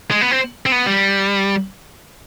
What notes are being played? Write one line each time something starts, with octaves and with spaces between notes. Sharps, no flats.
G#3
B3
C4
C4
B3
G3